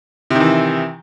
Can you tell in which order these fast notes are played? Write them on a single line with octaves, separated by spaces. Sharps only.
C3 D#3 E3